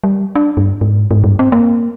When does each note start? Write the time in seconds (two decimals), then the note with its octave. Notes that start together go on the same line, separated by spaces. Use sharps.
0.04 G3
0.35 D4
0.57 G2
0.81 G#2
1.11 G#2
1.24 G2
1.39 C4
1.52 A#3